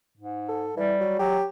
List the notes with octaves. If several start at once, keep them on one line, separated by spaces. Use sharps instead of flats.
G#2
A4
E3 G3
F#3
F#3 G4